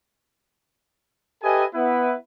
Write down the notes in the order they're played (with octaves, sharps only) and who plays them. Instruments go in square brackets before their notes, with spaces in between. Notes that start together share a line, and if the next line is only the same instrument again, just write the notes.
[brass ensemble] G4 A4 B4 D#5 E5 G#5
B3 E4 B4